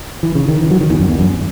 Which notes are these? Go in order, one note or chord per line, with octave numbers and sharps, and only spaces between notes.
E3
C#3
D#3
E3
F#3
D#3
E2
F#2
E2
F#2